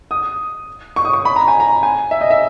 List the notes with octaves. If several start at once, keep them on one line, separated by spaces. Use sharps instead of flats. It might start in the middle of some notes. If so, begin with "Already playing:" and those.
D#6
C#6
D#6
C#6
B5
A#5
G#5
A#5
G#5
E5
D#5
E5